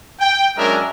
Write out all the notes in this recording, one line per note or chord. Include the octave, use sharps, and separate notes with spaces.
G5
F#3 G#3 C#4 D4 A#4 E5